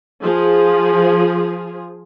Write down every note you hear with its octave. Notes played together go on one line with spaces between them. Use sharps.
F3 G#4